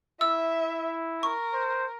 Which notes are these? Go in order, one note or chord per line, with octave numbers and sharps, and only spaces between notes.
E4 E5 E6
A#4 C#6
C5